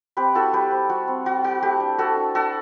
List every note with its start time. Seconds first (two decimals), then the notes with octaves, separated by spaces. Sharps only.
0.17 C4 G4 B4
0.35 E4 F#4 A4
0.53 G3 G4 B4
0.72 C4
0.90 G3 F#4
1.08 C4
1.26 G3 F#4
1.44 G3 F#4
1.62 A3 G4
1.80 D4
1.98 A3 F#4 A4
2.17 D4
2.35 D4 F#4 A4